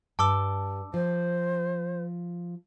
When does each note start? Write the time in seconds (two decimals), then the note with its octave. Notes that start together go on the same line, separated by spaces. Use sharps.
0.19 G2 A5 D6 E6
0.94 F3 C5